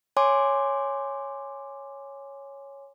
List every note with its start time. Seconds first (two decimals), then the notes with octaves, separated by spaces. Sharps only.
0.17 C#5 G#5 C6 D6